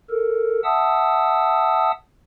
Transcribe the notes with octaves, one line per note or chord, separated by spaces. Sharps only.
A4 A#4
E5 F#5 A5 D#6 E6